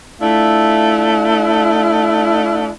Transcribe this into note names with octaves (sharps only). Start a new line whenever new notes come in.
A3 D4 E4 F4